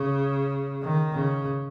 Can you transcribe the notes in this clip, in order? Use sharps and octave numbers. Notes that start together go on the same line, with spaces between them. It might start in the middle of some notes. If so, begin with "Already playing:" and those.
Already playing: C#3
D#3
C#3